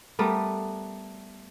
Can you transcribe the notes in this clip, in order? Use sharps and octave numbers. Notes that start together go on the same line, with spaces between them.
G3 A3 B3 A#4